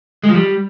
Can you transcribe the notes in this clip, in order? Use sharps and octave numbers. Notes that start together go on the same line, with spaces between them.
G#3
F3
G3